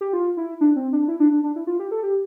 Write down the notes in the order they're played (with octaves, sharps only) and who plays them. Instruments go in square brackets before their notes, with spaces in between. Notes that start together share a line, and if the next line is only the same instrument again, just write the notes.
[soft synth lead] G4
F4
E4
D4
C4
D4
E4
D4
D4
D4
E4
F4
G4
A4
G4